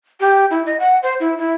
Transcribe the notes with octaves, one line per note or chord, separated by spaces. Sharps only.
G4
E4
D#5
F#5
C5
E4
E4